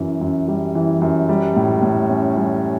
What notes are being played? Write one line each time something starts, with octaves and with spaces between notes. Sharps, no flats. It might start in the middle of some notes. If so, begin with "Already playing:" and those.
Already playing: F#2 E3
F#2
G3
E3
F#2
G3
A2
A2
C#4
G3